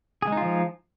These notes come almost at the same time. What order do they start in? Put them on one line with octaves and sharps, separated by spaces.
G#4 G#3 D#4 F4 F3